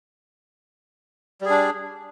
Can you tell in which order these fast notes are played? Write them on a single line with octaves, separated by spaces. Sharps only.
G3 G#4 D4